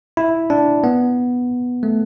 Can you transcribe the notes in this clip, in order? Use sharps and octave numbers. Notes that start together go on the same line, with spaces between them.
E4
D4
B3
A3